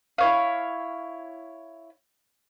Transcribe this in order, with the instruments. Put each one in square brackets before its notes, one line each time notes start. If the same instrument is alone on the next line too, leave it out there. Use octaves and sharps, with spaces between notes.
[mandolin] E4 C#5 F5